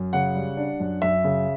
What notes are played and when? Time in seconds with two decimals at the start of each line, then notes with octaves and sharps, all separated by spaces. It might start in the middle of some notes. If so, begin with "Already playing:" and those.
Already playing: F#2
0.13 C#3 F#5
0.35 G3
0.57 D4
0.80 F#2
1.02 F#2 E5
1.24 C#3